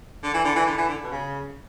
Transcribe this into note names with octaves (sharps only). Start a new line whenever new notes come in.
D3
E3
D3
E3
D3
E3
D3
B2
C#3